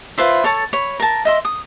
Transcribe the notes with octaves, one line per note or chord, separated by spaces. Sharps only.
F4 B4 C5 E5
A4 C#5 A5
C#5 B5
A#4 A5
D#5 E5 C6
D#6